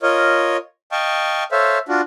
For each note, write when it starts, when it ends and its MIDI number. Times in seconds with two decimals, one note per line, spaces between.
0.03 0.57 65
0.03 0.57 70
0.03 0.57 73
0.03 0.57 75
0.92 1.44 75
0.92 1.44 77
0.92 1.44 79
0.92 1.44 81
0.92 1.44 85
1.52 1.78 69
1.52 1.78 72
1.52 1.78 73
1.52 1.78 76
1.52 1.78 77
1.89 2.01 62
1.89 2.01 65
1.89 2.01 66